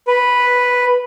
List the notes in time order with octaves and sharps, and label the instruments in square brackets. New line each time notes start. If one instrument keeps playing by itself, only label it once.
[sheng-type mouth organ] B4